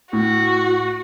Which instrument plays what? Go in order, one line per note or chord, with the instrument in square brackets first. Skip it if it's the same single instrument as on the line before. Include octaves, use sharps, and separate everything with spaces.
[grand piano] A2 [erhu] F#4